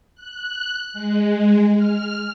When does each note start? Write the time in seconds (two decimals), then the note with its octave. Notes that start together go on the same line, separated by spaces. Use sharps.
0.15 F#6
0.93 G#3
1.76 F6